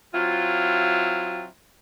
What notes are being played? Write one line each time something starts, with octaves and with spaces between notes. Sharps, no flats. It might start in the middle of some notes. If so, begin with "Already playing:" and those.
F#3 C4 E4 F4